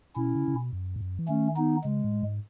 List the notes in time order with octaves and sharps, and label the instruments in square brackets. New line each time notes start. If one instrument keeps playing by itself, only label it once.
[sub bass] B2 [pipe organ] C#4 E4
[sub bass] C#3
C#3
B2
F#2
G#2
F#2
E3
[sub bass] D#3 [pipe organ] A3 C#4
[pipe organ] B3 D#4
[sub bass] C#3 [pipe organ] G#3
[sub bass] A2
G#2